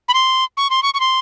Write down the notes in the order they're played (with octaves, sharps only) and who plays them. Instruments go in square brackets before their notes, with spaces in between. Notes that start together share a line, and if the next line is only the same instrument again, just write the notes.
[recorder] B5
C6
C#6
C6
C#6
C#6
C6